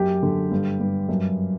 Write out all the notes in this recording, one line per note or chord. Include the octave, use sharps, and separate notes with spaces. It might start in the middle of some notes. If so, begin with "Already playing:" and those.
Already playing: F#2 G4
D3
G2
G2
F#2